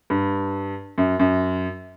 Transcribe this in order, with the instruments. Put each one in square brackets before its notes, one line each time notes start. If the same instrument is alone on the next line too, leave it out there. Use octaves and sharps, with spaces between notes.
[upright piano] G2
F#2
F#2